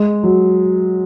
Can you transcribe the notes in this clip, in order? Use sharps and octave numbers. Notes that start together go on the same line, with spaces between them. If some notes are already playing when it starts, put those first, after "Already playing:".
Already playing: G#3
F#3